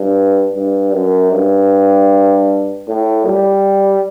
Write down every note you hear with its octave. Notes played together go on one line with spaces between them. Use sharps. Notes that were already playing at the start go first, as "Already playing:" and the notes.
Already playing: G2
G2
F#2
G2
A2
G3